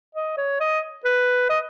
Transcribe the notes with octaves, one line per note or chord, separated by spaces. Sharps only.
D#5
C#5
D#5
B4
D#5